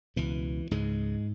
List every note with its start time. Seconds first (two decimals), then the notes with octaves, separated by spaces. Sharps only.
0.16 C#2 B2 E3
0.71 C#2 G#2 C#3 G#3